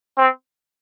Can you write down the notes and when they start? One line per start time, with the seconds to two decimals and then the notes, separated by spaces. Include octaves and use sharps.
0.17 C4